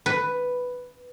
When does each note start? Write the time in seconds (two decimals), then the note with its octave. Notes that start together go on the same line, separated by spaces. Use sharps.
0.06 B4